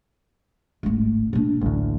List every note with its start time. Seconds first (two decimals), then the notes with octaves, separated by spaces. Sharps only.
0.83 D1 G#1
1.33 A#2 D4
1.61 A1 D2 F#3